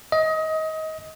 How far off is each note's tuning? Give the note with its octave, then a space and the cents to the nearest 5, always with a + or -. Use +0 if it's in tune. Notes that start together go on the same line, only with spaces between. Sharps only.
D#5 +25